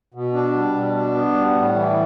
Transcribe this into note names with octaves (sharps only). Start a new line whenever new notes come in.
B2
D4
G3
B2
D4
B3
G3
A2
E3